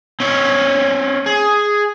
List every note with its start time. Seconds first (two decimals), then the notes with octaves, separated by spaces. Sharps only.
0.20 C4 C#4 C#5
1.26 G#4